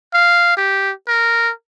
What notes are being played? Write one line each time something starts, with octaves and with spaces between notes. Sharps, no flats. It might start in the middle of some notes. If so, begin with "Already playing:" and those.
F5
G4
A#4